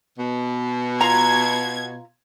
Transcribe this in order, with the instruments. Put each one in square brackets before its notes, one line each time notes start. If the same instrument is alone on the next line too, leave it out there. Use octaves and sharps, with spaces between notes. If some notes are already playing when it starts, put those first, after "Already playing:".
[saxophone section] B2
[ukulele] F4 A#5 [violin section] G#6